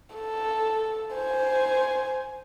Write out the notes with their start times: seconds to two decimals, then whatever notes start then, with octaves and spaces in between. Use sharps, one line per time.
0.16 A4
1.16 C5 G#5